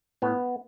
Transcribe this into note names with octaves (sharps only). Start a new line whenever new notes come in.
A2 B3